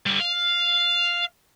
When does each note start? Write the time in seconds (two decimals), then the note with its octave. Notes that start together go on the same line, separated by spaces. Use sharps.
0.06 D3 G3
0.20 F5